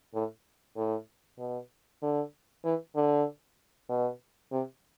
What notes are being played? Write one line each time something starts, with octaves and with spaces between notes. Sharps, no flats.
A2
A2
B2
D3
E3
D3
B2
C3